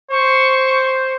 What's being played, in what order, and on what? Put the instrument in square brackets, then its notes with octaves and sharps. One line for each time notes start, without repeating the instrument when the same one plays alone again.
[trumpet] C5 [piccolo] C#6